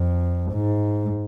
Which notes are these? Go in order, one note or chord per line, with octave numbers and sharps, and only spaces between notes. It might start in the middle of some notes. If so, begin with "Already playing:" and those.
Already playing: F2
G#2